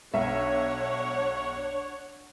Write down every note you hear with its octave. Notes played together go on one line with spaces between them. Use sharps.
B1 D4 C#5 E5 F#5